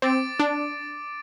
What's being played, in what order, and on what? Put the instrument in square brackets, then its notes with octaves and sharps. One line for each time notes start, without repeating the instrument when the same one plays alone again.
[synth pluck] C4 [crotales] D6 A6 D7
[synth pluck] D4